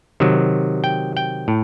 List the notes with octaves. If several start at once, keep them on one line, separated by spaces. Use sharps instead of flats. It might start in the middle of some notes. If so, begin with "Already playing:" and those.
C3 D#3 F#3
G5
G5
A2